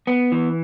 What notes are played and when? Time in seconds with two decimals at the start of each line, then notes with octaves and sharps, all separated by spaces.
0.07 B3
0.32 E3